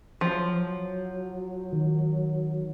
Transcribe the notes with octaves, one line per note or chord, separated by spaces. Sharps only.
F3 F#3
D#3